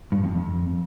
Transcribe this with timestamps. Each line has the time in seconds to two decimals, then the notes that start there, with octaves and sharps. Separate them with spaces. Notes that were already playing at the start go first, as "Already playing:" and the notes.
0.12 G2
0.24 F2
0.35 F2